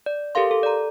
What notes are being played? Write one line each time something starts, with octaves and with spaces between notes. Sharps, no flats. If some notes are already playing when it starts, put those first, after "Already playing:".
D5
G4 A4 A#4 F5 C6
A4
D5 A#5